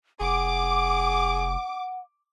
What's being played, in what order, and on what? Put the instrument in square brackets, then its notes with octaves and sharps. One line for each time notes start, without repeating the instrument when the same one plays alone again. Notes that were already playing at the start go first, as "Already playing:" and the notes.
[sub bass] F1 [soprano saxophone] G#4 [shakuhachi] F#5 [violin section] D6